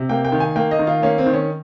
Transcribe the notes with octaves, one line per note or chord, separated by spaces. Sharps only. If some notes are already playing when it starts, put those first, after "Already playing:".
Already playing: C3
A#3 G5
G5
D#3
G#5
A#3 G5
D#5
D#3
F4
A#3 C#4
C4
D#3
C#4